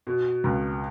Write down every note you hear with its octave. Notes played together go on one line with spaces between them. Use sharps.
B2
C#2